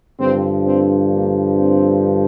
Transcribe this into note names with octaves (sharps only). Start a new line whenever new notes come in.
G2 D3 F3 C4
C4
A#3
C4